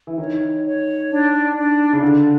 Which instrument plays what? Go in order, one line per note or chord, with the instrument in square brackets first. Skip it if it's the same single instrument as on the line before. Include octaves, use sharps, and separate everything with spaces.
[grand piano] E3
[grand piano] D#3 [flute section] C#5
[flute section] C#5
D4
D4
[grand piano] C#3
[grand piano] D3 [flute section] D4